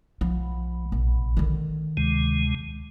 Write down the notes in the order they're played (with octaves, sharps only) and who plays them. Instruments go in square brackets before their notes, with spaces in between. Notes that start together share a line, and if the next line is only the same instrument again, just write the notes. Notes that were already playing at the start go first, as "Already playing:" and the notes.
[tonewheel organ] B1 [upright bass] F3
[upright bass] A#1 C3
D3 D#3
[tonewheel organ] D2 C3 G#3